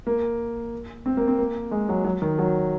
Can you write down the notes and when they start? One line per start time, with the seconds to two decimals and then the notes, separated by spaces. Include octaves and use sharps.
0.07 A#3
1.06 C4
1.17 A#3
1.28 C4
1.39 A#3
1.71 G#3
1.89 F#3
2.04 F#3
2.22 D#3
2.39 F#3